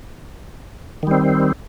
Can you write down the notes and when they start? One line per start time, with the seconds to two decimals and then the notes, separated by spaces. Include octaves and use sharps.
1.03 D#3
1.07 G3
1.11 C4